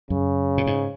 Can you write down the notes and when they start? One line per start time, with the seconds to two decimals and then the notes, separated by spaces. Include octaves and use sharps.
0.10 F#2 C#3
0.58 A#2
0.67 G#2